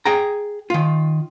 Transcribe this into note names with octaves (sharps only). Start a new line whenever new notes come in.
G#4 G5 A#5
D#3 F4